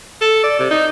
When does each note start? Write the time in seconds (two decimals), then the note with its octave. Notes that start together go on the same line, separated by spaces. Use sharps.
0.21 A4
0.44 D5
0.60 C3
0.71 D#4